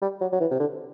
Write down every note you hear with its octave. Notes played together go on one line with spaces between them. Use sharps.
G3
F#3
F#3
E3
C3
D3